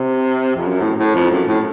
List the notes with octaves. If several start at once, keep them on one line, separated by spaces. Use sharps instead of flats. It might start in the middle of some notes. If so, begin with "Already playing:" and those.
Already playing: C3
F2
F#2
A2
A2
F2
F#2
A2